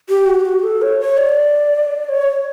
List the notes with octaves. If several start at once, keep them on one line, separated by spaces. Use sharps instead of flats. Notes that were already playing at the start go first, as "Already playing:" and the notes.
G4
F#4
G4
F#4
A4
C#5
C#5
D5
C#5